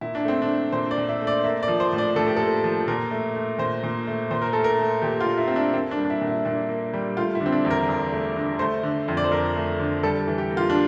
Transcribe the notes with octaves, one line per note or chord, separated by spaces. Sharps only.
A#2 E4
D4
A3 C4
D4
A3
A#2 C5
D5
A#2
E5
A3
D5
A#3 E5
D5
F3
C5
A2
D5
A2 A4
G4
A#3 A4
F3
A#2 A#4
A3
A3
A#2 C5
A#2
A3
A#2 C5
A#4
A3 A4
A#4
A3
A#2 G4
F4
A#2
E4
A3 C4
D4
A#3 C4
D4
G3
D4
E4
A#2
E4
A#2 D4
A#3
G3
A3 F4
E4
D3
C4
D4
E2
A#4
E2
A3
D3
A3 C5
D3
F2
D5
C5
F2 A#4
A3
D3
G3 A4
E3
G4
A#3
F4
D4